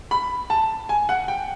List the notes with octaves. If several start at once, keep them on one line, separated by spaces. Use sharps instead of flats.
B5
A5
G#5
F#5
G5